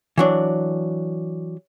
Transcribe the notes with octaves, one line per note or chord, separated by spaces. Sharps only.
E3 F#3 D4